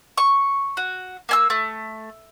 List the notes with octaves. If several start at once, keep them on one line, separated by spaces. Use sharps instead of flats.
C#6
F#4
A#3 G#5 E6
A3